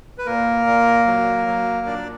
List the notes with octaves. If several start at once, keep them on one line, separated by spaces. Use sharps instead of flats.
B4
A#2 A#3 A#4
A#2
F#3
F#3
A#2 D4 D5